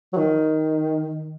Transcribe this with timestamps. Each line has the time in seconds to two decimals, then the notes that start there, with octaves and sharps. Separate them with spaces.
0.13 F#3
0.17 D#3